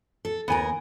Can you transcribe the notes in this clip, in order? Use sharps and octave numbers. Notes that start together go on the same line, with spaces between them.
A4
D#2 B3 D#4 A#4 G#5